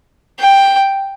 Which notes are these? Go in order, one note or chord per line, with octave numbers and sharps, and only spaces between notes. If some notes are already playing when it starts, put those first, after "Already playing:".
G5